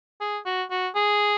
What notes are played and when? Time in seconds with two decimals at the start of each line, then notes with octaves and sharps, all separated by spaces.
0.21 G#4
0.46 F#4
0.71 F#4
0.95 G#4